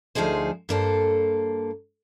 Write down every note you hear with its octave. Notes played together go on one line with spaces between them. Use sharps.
D2 F3 D#4 G#4 C5
G2 A#3 A4 C5